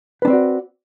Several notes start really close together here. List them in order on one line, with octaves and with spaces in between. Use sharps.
B4 D4 C4 D5 F#4